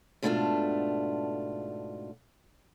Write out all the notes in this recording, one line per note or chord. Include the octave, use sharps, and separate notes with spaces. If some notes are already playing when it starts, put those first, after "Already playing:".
G#2 B2 A3 D4 E4 F4